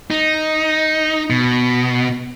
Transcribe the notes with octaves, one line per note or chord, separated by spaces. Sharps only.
D#4
B2